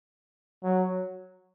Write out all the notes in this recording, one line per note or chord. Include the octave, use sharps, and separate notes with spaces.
F#3